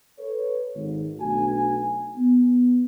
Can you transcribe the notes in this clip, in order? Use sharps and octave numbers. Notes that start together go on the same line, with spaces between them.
A4 B4 C#5
G#1
B1 A3 D4 F#4 G#5
B3